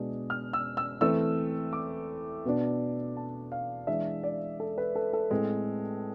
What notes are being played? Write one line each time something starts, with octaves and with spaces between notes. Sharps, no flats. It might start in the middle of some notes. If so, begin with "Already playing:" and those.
Already playing: B2 G#3 B3 D4
F6
E6
E6
E3 A3 C4 E6
D6
B2 B3 D4
A5
F5
E3 G#3 D4 E5
D5
A4
B4
A4
A4
A2 G#3 C4